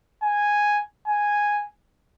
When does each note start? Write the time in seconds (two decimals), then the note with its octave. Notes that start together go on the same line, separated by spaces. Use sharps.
0.23 G#5
1.07 G#5